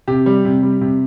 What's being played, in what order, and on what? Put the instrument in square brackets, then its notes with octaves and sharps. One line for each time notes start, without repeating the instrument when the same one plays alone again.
[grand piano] C3 G4
G3
C3
G3
C3